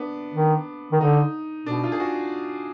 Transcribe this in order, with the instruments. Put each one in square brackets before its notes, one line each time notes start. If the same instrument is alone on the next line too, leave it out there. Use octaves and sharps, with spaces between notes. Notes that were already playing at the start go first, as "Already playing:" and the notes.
Already playing: [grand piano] B3 D4
[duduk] D#3
D#3
[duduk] D3 [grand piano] D#4
[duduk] B2 [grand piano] D4
[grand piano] F4
G#4
F#4